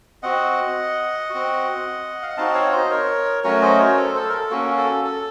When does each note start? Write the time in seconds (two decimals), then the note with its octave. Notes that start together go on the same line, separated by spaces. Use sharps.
0.23 C4 F#4 D#5 F#5
1.30 C4 F#4
2.23 F5
2.30 F#5
2.37 C4 D#4 F#4 F5 A5
2.55 C#5 F5
2.72 C5 D#5
2.90 A#4 C#5
3.44 F#3 A3 C#4 F#4 A#4 C#5
3.62 C5 D#5
3.79 A#4 C#5
3.97 A4 C5
4.15 A4
4.29 A#4
4.33 A4
4.51 A#3 C#4 F#4
4.78 A4
5.04 A4